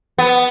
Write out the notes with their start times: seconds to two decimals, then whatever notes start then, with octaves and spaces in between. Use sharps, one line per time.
0.18 B3